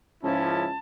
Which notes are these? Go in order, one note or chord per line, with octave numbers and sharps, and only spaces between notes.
C#2 G#2 F3 C#4 E4 A5